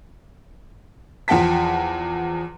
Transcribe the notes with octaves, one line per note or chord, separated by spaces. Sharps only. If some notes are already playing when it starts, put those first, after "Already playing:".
E2 F3 F#5 G5 A5 B6